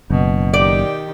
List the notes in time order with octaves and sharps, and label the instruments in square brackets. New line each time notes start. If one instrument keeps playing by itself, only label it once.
[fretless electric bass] F#1 [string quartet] B2
[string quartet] D#3 G4 [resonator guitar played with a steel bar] D5